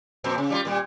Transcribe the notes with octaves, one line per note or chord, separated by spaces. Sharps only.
F2 A#2 C4
C#3
G3 D4 F4
A#2 G3